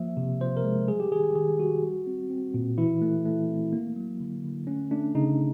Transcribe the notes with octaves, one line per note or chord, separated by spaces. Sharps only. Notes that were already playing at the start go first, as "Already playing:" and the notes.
Already playing: F3 A#3 E5
C3
F3 C5
A#4
G#3
G3 G#4
G4
D#3 G#4
G#4
G4
D#3 G#4
G3 F#4
G3
C4
C4
A#2
E3 E4
A3
A3
C4
A#3
F#3
D3
D3
A3 C#4
A3 D4
C#3 D#4